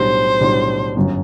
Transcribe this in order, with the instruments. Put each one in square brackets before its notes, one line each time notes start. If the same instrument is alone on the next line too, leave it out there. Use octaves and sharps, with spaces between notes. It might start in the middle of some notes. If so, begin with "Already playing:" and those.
Already playing: [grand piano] B1 A2 G3 D4 [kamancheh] C5
[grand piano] B1 A2 G3 D4
G1 F#2 F#3